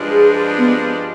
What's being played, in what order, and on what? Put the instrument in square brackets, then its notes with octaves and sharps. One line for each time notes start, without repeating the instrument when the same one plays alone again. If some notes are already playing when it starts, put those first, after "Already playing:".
Already playing: [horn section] G2 F3 G#3 D4
[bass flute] G#4
B3